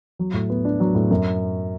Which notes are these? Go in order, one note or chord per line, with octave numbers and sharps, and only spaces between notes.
F#3
A2
B3
D4
F#3
A2
F#2